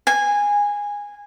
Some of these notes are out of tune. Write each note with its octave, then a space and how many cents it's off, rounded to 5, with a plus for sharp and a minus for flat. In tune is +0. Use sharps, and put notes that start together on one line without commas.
G#5 -15